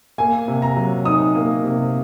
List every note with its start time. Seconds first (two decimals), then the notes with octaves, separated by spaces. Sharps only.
0.18 A#3 G#5
0.48 C3
0.62 A#5
0.76 F#3
1.05 D#4 D#6
1.35 A#3
1.64 C3